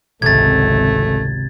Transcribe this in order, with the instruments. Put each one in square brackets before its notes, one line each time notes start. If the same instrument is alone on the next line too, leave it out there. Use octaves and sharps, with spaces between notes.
[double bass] G#1 C#2 [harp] C3 [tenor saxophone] A3 [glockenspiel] G#6 A6